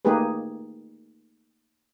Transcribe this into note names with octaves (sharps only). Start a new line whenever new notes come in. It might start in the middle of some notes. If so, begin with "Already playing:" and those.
A3 A#3 D#4 G4 G#4 B4